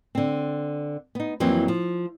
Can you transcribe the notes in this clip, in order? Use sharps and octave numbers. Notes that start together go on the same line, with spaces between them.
D3 C4
B3 D#4
F2 E3 F#3 A#3 C4
F3